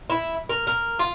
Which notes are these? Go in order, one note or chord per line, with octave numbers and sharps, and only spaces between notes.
E4
A#4
A#4
F4